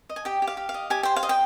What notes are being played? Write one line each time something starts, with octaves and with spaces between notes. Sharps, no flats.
D#5
G#5
G4 G5
G4
F5
G4
F5
D#5
G4 G#5
C5 G5
F5
D#5
G5